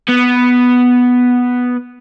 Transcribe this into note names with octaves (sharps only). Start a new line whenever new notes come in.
B3